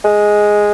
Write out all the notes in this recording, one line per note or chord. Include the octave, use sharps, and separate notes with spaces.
G#3